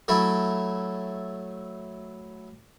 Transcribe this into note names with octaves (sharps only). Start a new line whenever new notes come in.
F#3 A3 E4